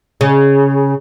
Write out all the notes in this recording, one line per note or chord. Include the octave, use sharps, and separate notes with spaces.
C#3